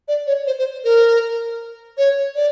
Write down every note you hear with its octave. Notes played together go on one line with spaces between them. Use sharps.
D5
C#5
C5
C5
A#4
C#5
D5